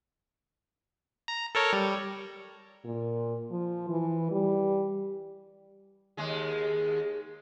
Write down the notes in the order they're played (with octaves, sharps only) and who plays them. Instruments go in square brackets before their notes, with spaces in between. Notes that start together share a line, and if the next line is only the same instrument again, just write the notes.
[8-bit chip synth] A#5
A4 A#4 C#5
G3
[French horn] A#2
F3
E3
G3
[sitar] D#2 G#3 G#4